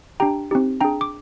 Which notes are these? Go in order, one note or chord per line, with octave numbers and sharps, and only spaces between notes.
D4 G4 G5 A#5
C4 D#4 G4
D4 G#4 G5 A#5
D6